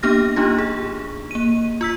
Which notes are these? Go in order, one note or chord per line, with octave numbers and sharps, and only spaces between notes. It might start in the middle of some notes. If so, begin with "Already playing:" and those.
A#3 B3 D4 G4 F6 A#6
A#3 D4 D#4 F4 G4
G#4
A#3 D#7
F4 E6 B6